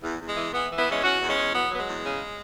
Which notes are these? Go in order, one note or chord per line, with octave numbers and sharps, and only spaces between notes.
E2
E2
G#3
E3
E3 B3
E3
B3 E4
E2 G#3 C#4
E2 C#4 F#4
E2
G#3 C#4
E2
F#3 B3
F#3 B3
G#3
E2
C#3